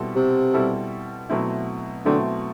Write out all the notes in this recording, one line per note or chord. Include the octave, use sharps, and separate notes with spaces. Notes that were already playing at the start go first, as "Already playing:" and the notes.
Already playing: B2 G3 C4 E4 A4
C3
B2 G3 C4 E4 A4
B2 F#3 A3 C4 E4
B2 D3 F#3 A3 C4 E4